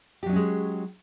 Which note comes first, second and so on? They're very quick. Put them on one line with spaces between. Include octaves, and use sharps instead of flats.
G4 F#3 D#4 C#4 G#3